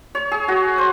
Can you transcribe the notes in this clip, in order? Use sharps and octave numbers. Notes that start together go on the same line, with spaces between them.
C#5
G#4
F#4
C5